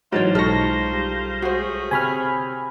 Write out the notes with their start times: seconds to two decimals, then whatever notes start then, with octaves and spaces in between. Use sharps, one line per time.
0.12 G#2 E3 F#3 F4 A#4 C5 C#5 A6
0.35 B1 G#3 D#4 A4 C#6 F6 A#6
0.93 G3
1.42 A3 C#4 F#4 G#4 C5
1.91 C3 G#5 B5 F6